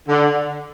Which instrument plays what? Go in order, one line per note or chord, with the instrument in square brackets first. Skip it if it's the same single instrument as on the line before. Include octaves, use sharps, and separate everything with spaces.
[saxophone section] D3